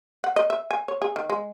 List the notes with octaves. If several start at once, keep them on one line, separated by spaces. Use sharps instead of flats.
F#5
D#5
E5
G#5
C#5
G#4
D#3
G#3